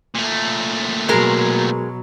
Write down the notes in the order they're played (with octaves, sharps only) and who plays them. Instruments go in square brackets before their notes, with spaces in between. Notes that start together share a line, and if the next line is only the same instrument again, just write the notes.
[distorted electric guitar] A#2 A3
[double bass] B2 F#3 [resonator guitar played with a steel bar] G#3 G#4 A#4